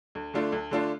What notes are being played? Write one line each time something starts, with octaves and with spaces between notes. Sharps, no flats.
D2
D3 A3 D4 F4
D2
D3 A3 D4 F4